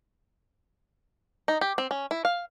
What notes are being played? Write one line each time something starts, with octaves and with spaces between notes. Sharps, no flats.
D#4
G4
C4
C#4
E4
F5